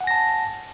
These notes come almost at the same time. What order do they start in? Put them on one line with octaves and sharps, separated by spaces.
F#5 G#5 A#6 A5